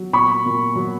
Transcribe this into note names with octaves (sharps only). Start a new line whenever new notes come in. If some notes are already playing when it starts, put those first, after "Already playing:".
Already playing: F#3
A#2 B5 C#6
A#2
F#3